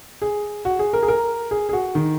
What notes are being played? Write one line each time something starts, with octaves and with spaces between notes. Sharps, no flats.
G#4
F#4
G#4
A#4
G#4
A#4
G#4
G#4
F#4
D#3